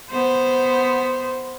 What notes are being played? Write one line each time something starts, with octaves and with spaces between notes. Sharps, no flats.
B3 C5